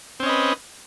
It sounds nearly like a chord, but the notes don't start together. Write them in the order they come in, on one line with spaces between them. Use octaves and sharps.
C4 C#4 D#5 B4